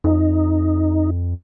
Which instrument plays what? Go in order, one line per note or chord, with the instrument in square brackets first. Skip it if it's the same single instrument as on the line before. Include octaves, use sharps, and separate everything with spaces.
[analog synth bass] F2 [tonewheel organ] D#4